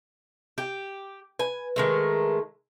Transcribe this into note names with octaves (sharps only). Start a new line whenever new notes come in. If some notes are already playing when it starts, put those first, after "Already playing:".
G4
B4 G#5
D#3 G#3 A3